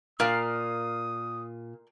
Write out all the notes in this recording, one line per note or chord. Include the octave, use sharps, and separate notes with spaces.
A#2 A#4 D5 F5 D#6